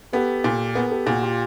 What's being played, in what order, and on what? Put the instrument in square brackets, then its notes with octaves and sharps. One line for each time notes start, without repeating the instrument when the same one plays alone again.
[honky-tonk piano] B3 [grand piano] G4 A4
[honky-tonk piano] A#2
[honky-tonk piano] B3 [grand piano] G#4 A#4
[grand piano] G4 A4
[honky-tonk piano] A#2 [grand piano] F#4 G#4
[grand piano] F4 G4